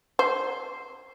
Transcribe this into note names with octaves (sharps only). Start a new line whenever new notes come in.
C5